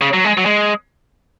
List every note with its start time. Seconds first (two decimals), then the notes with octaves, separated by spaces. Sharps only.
0.01 C#3
0.13 F#3
0.24 G#3
0.38 F#3
0.46 G#3